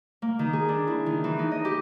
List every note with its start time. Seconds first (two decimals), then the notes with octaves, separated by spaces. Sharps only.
0.22 A#3
0.39 D#3
0.53 G#4
0.69 D4
0.87 E4
1.06 D#3
1.24 E3
1.39 D#4
1.52 D#5
1.65 G4